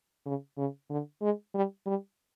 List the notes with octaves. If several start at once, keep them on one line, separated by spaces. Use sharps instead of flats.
C#3
C#3
D3
G#3
G3
G3